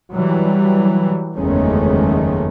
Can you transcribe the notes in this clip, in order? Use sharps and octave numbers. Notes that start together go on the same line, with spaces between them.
E3 F#3 G3
F#1 E2 D#3 G#3 A3 C#4